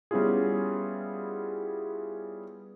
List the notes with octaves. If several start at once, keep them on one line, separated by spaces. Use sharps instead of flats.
G3 B3 C#4 E4 F4 G#4